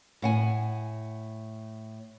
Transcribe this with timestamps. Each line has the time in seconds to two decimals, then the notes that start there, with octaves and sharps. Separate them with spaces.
0.22 A2 F#5 G#5